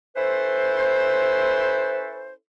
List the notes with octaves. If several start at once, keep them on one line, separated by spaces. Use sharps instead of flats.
C#4 E4 A4 B4 C5